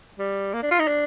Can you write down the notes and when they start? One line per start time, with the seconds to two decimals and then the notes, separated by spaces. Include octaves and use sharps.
0.19 G3
0.53 A#3
0.62 D4
0.71 F4
0.79 D#4
0.87 D4